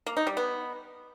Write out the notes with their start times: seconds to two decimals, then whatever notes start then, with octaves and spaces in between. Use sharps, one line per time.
0.06 A#3
0.17 D#4
0.27 G3
0.37 B3